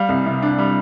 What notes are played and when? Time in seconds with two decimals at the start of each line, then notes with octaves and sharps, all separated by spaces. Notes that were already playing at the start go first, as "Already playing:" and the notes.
Already playing: G3 F5
0.09 C2
0.26 C3
0.42 D4
0.58 G3